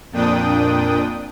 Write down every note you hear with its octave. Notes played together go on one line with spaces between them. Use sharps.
F2 A#2 D4 G5 D#6